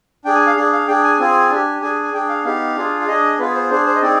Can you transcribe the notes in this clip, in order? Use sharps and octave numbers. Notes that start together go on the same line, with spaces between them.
D4 G#4 G5
G#5
F5
D4 G#4
F5
D4 G#4 G5
G#5
C4 F4 G#4
D4 G4
D4 G#4 G#5
G#5
D4 G#4 G5
F5
B3 D#4 G4 F5
D4 F4 G#4
F5
D4 G#4 D#5
B3 F4 G#4 B4
C5
D4 G#4 C5
C5
D#5
C4 D#4 G#4 D5